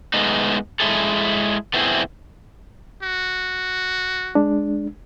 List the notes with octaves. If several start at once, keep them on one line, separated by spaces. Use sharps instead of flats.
G#3 A3 B3 D#4
G#3 E4 G#4 A4
A3 B3 C4 E4 F#4 G#4
F#4
G#3 D4